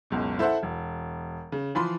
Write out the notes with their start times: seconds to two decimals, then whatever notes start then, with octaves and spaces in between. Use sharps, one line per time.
0.10 F#1 C#2 B2
0.39 E4 A4 C5 E5 F#5
0.63 E1
1.52 C#3
1.75 E3 F3 B5 C6